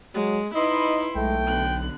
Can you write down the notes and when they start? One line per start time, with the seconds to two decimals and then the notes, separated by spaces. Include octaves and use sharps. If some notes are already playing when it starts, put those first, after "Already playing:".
0.15 F#3 G#3
0.55 D#4 E4 B4 D#5 C6
1.16 B1 G#3 A3 G5
1.45 B2 D3 F#6